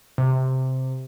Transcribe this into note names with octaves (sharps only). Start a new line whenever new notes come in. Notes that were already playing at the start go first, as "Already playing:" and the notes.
C3